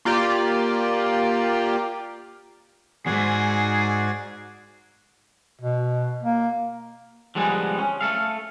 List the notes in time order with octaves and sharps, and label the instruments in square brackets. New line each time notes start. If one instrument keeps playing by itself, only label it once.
[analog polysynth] A#3 F4 G4 D5
[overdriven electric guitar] E2 G#2 [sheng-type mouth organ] F#4 D5 G#5 [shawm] G#4
[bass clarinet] B2
A#3
[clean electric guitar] D3 F3 G3 G#3 B3 G#4
C#4
A3 A4 F5